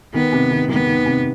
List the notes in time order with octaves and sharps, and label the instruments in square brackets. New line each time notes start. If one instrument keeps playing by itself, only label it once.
[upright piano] D#3 [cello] B3
[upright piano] C3
D#3
[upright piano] D#3 [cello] B3
[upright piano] D#3
C3